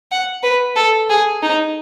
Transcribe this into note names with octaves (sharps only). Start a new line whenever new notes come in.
F#5
B4
A4
G#4
D#4